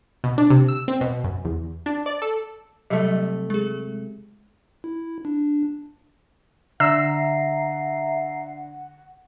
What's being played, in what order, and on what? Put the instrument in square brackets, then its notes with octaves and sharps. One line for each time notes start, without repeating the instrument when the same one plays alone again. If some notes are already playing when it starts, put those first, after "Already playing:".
[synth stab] B2
D4
C3
E6
C4
B2
F#2
E2
D4
D5
A4
[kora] C3 A3 [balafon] F#3 G3
[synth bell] G#3 G#4
[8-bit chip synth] E4
D4
[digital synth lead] D3 [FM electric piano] E5 A#5 C7 [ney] F#5 [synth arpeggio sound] E6